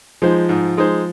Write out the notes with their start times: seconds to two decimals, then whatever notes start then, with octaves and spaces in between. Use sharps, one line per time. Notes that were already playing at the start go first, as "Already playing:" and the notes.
0.22 F3 G#3 D#4 C5
0.49 G#2
0.77 G#3 D#4 C5